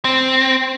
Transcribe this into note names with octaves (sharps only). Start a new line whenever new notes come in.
C4